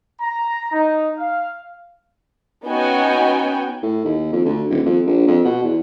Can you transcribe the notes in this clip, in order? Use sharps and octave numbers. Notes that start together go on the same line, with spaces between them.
A#5
D#4
F5
B3 C#4 D#4 F#4 G5 G#5
A2
D#2
F2
D2
D#1
F2
A#1
F2
B2
E2